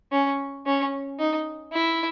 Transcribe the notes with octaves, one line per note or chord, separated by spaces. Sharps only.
C#4
C#4
D#4
E4